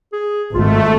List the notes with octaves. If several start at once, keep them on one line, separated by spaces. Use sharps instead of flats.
G#4
G#1 A3 F4